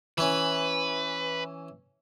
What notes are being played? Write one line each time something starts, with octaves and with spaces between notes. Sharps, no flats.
E3 C#4 B4